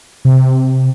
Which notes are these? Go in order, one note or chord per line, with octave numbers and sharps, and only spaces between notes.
C3